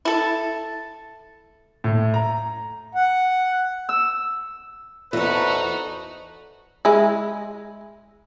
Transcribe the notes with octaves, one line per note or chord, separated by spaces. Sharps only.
E4 A4
A2
A#5
F#5
E6
E2 D#4 F#4 A4 B4 C5
G#3 E4